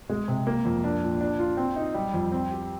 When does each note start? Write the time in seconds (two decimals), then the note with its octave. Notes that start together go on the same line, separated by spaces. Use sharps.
0.10 G#3
0.28 C3
0.47 A#3
0.65 F2
0.84 D4
1.03 A#2
1.21 D4
1.39 F4
1.57 C4
1.76 D#4
1.94 G3
2.14 F2
2.32 C4
2.51 G4